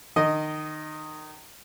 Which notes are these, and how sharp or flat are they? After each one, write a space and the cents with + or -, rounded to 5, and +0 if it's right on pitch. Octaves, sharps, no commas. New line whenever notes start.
D#3 -25 D#5 +0